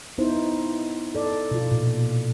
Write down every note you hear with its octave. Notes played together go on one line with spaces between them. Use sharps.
B3 D#4 E4 C5
A4 D5
B2 F4
A#2